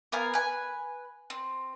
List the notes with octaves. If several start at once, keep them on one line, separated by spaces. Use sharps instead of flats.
B3 A#4 F5 G#5
B4 G#5
C4